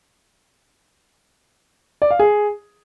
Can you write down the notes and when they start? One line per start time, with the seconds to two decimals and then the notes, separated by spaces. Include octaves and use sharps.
2.02 D5
2.11 F5
2.19 G#4